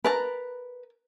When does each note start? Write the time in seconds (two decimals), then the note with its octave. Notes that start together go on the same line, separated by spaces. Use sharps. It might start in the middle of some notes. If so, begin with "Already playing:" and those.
0.04 A#4 B4 A5 A#5